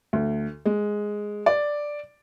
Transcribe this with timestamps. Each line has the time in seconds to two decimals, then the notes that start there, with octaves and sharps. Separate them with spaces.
0.13 D2
0.66 G#3
1.46 D5